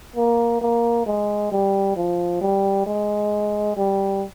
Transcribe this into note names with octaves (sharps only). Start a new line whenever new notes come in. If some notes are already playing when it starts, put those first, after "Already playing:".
A#3
A#3
G#3
G3
F3
G3
G#3
G3